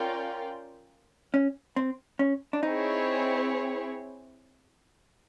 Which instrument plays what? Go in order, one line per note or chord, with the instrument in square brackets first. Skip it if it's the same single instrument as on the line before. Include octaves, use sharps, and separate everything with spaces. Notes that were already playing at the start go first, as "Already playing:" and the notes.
Already playing: [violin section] C#4 F4 A#4 D5 G5
[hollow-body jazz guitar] C#4
C4
C#4
D4
[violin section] C4 E4 G#4 C#5 [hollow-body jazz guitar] D#4